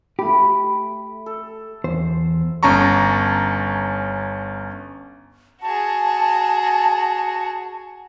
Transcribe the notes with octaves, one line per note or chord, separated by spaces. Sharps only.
A3 G4 B5
A4
E2 C5
G1 C#4 A5 A#5 C#6
F#4 G#4 A5